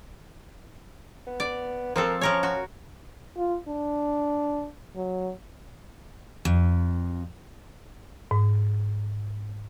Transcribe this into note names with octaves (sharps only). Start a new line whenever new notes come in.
B3
D5
F3 C4 A4 A#4
F3 C#4 A#4 C#5
F#4
F4
D4
F#3
F2
G#2